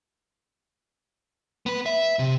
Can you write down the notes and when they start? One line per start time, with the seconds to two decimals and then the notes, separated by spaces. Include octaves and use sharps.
1.66 B3 B4
1.86 E5
2.19 C3